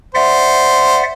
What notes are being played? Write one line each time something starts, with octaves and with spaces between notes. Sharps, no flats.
C5 D5 E5 F#5